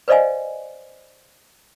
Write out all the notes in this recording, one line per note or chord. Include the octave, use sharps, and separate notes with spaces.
B4 C5 D5 D#5 F5 G#5